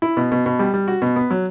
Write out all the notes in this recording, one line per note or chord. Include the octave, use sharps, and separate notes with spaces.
E4
B2
B2
B2
G3
G3
F#4
B2
B3
F#3